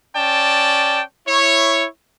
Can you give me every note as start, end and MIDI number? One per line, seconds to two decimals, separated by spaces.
0.16 1.02 61
0.16 1.02 74
0.16 1.02 79
0.16 1.02 81
1.27 1.86 64
1.27 1.86 73